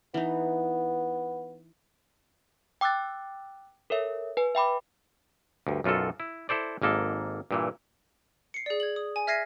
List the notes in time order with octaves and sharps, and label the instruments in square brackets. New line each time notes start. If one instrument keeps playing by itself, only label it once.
[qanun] E3 D#4 [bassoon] B3
[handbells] G5 D6 E6 F#6 A6
A4 A#4 C#5 E5
B4 G#5
E5 G5 B5 D6
[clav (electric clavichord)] D2 G2
B1 F#2 F4 F#4 A4
E4
E4 A4 C5 D5
G#1 G#2 A#3 A4
G2 A#2 E3
[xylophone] C7 C#7
G#4 D5
G#6 F#7
D#6
G#5
E5 F6 G#6 A#6 C7 D#7